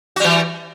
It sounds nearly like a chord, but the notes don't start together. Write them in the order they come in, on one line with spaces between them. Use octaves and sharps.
F#4 G3 E3